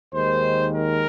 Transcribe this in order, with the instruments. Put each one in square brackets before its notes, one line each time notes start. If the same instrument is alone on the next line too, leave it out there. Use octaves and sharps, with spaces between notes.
[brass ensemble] D#2 D#3 G#3 C5
A#4